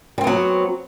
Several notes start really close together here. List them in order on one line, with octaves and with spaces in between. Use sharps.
G3 C4 B3 F#3